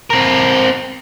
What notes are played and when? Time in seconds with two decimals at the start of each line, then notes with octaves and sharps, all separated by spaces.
0.10 C4 A#4